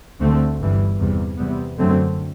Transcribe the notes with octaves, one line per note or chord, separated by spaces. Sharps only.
D2 D3 A3 C4
G1 G2 E3 G3
E2 C3 G3
E2 C3 G3 B3
F#2 D3 F#3 A3 C4